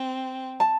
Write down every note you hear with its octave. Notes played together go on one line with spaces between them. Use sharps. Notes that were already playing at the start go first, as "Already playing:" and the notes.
Already playing: C4
A5